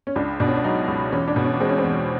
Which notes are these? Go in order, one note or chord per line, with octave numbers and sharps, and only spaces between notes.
C#4
C#2 D4
B2 D4
C#4
D4
F#3 D#4
C#2
E2 C#4
D4
B2
C#4
G#3 C4
C#4
C4
E2